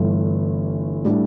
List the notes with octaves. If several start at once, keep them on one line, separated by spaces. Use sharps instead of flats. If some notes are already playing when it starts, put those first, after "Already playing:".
Already playing: G1 G2 E3 A3
A2 G3 D4